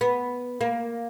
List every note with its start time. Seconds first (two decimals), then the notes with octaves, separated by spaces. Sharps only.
0.01 B3
0.61 A#3